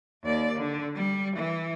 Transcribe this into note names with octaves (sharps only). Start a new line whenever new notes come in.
D#2 D5
D3
G3
E3